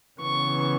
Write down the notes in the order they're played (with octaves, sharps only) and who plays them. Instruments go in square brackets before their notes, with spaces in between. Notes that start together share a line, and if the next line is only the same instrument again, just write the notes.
[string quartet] C#3 E3 B3 C#6